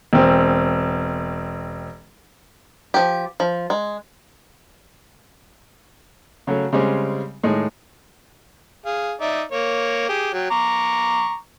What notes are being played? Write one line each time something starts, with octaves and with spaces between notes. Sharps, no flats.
E1 C4
F3 G4
F3
G#3
C#3 F#3 A3
C#3 G3 G#3 C4
A2 D#3 G#3
G#4 F5
D#4 D5 E5
A#3 C#5
G4 G#4
F#3 G5
A#5 C#6 D6